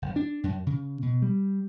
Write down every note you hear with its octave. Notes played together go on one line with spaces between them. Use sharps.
F#1
D4
F#2
C#3
B2
G3